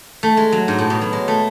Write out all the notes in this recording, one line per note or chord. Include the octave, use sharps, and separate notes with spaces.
A3
G#3
F#3
G#2
A2
B2
F#3
G#3
A3